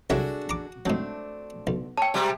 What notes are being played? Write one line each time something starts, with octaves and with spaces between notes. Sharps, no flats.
C2 F#3 D4 F#4 G#4 A4 E5
A#5 D6
G#2 F#3 A3 C4 D4
B1
C#5 G5 A5
C3 G3 G#3 G4 C5